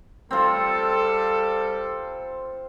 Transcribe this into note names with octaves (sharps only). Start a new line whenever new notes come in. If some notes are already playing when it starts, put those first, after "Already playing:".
G3 C4 F4 A4